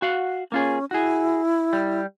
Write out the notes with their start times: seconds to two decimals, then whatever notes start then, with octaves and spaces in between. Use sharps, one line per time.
0.02 F#4 F5 F#5
0.52 A#3 C#4 F4 G#4
0.91 E4 F#4 G#4
1.73 G3